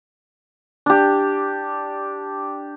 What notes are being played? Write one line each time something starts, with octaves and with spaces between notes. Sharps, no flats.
D4 G4